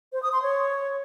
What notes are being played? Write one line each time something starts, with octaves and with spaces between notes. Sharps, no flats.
C5
D#6
C6
C#5